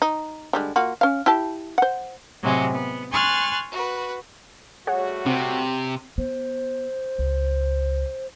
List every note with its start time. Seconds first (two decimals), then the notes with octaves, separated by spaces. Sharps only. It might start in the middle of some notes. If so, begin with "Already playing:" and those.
0.02 D#4
0.53 D3 G3 G#3
0.76 A#3 F4 F#4
1.01 C#4 F5
1.26 E4 G4 A5
1.78 C5 F#5
2.43 A2 C3 F#3 G#3 C4
2.73 B3
3.11 G#5 C6 C#6 F6 F#6 A6
3.71 F#4 B4
4.87 G3 A3 F#4 G#4 C#5 F#5
5.26 C3 C4
6.18 B3 C5
7.19 C#2